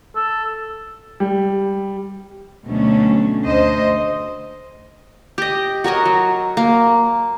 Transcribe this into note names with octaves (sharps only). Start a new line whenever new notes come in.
A4
G3
D2 B2 F#3 A3 C#4
D2 C5 D#5
G4 D#5
F#4 A#4 C#5 D#5
F#3
A#3